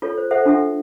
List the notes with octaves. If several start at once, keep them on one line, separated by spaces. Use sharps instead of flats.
F4 A4 C#5
C5
A4 C5 E5 F#5
D4 F4 F#4 A4 E5 F#5